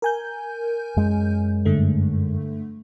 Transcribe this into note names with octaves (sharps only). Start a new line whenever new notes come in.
A#4 G#5 G6
F#2 G#3
G2 D3 A3